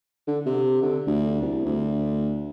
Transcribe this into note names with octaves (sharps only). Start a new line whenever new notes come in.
D3
C3
D3
D2
C2
D2